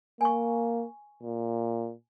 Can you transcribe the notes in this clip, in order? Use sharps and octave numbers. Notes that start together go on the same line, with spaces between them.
A#3 G#5 C#6
A#2